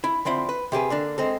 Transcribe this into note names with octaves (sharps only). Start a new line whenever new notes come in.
E4 B5
D3 F3 C4 E4
B4
C3 G4 G#4 B4
D3 A#3 D4
G#3 C4 A4